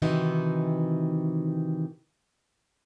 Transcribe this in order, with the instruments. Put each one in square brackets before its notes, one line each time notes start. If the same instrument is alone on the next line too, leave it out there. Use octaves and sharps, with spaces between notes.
[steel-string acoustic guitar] C3 D#3 E3 D#4 F#4